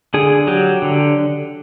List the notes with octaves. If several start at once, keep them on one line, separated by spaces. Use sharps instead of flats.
D3 G#4
F#3 G4
D3